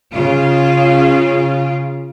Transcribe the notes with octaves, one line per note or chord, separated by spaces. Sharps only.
C#3 F4